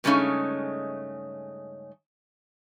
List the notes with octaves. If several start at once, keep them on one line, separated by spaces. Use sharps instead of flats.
G2 C#3 G#3 A3 C#4 D#4